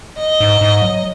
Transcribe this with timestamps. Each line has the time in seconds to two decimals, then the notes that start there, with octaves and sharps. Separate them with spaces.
0.20 D#5
0.40 G#2
0.61 G#2
0.82 F#3